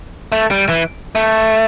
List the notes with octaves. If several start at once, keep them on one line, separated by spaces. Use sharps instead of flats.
A3
G3
E3
A3